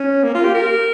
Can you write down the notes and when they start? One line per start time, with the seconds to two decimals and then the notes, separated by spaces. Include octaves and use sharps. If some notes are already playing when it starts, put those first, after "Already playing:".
Already playing: C#4
0.24 A#3
0.35 F4
0.44 G4
0.55 A#4